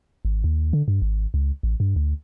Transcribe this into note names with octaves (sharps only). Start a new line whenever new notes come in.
G#1
D#2
D3
G2
G#1
C#2
A1
G2
D2